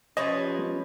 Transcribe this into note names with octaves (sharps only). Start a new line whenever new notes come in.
F3 C#4 G4 B4 C#5 D#5